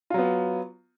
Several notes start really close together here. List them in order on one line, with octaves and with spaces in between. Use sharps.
F4 F#3 B3